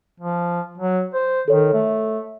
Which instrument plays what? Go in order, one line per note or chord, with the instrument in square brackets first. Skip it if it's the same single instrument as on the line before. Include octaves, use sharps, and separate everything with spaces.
[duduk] F3
F#3
C5
[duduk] D#3 [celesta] A4 C#5
[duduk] A3